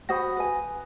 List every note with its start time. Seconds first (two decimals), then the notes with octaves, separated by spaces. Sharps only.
0.09 F#4 C5 F#5 B5 D#6 A#6
0.37 B4 G#5